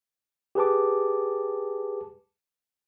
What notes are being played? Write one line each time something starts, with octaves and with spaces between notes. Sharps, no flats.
G4 G#4 B4 A5 D6